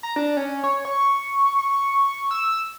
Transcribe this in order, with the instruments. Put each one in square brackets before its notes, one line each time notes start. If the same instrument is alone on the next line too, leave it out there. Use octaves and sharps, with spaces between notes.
[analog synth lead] A#5
D4
C#4
C#5
C#6
C#6
E6